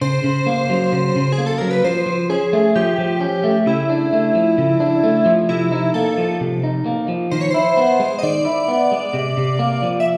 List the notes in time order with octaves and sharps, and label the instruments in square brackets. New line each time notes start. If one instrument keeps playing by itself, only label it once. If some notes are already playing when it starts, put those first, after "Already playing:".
[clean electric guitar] C#3 [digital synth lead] C5
[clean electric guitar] C#3
A#3
F#3
C#3
C#3
[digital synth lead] G#4
[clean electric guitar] A#3
[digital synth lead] A4
[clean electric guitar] F#3 [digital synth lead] A#4
[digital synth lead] B4
[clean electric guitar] F3 [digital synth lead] C5
[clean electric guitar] F3
[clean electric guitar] C#4 [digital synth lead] G#4
[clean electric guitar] A3
[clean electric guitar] F3 [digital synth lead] G4
[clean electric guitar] F3
C#4
A3
[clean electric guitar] C#3 [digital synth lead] E4
[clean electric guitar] D4
A3
F3
C#3
D4
A3
F3
[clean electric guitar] C3 [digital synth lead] E4
[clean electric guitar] D#4
[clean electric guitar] A#3 [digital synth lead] A4
[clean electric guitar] F3
C3
D#4
A#3
F3
[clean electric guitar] D#3 [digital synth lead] C5
[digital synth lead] C#5
[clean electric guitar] E4 [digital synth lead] C5
[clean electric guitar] B3
G#3
[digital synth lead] D#5
[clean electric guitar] D#3 [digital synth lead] D5
[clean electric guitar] E4
B3
G#3
C3
C3
A#3
F3
[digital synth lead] E5